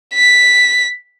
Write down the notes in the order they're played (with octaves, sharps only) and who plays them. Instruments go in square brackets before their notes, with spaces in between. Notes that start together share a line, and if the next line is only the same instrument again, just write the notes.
[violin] B6